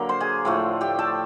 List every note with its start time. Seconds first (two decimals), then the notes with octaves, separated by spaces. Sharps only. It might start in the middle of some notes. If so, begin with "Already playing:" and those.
Already playing: D3 F#3 A#3
0.09 C5 C6
0.20 G#4 G#5
0.45 A2 F3 A3
0.81 G4 G5
0.99 A4 A5